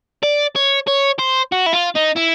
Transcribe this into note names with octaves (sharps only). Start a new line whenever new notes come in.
D5
C#5
C#5
C5
F#4
E4
F4
D#4
E4